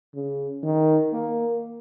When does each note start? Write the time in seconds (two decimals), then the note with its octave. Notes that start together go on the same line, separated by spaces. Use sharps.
0.15 C#3
0.63 D#3
1.13 A#3